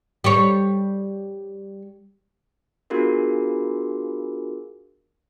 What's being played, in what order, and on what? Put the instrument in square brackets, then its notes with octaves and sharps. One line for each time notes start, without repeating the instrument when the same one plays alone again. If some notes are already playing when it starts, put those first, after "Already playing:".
[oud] G3 C#5
[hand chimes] B3 D4 F4 F#4 G#4 A#4